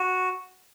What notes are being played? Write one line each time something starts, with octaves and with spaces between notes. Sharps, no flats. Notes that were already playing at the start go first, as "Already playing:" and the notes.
Already playing: F#4